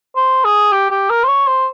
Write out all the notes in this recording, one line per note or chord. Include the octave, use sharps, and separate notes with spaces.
C5
G#4
G4
G4
A#4
C5
C#5
C5